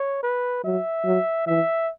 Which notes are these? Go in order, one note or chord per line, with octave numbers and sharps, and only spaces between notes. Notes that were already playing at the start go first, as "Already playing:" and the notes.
Already playing: C#5
B4
F#3 E5
F#3
E3 E5